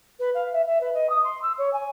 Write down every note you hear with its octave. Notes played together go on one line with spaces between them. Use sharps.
B4
F5
E5
E5
B4
D#5
D#6
C6
E6
C#5
G#5